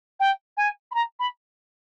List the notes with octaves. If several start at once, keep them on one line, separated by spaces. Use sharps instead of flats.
G5
G#5
B5
A#5
B5